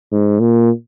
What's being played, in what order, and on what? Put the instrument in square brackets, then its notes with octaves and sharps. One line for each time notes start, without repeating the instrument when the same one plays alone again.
[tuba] G#2
A#2